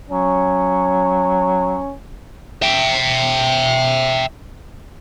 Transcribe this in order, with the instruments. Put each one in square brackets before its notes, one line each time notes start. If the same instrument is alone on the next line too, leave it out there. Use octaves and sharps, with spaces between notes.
[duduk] F#3 [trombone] C#4
[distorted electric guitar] E5 G5